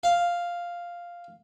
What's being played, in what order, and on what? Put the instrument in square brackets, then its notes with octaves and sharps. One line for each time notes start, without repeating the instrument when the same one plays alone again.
[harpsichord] F5